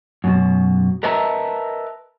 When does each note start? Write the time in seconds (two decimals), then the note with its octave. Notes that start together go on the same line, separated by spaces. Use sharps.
0.24 F#2 B2
1.03 A#4 B4 D#5 E5 A5 A#5